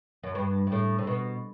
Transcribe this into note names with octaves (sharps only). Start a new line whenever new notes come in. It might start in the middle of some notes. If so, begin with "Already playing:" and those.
F#2
G2
G2
A2
C3
B2